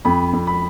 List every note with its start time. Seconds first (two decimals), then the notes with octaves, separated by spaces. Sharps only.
0.05 F2 B5
0.33 F2
0.47 B5